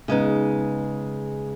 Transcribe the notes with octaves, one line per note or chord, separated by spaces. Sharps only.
C#3 G#3 B3 D#4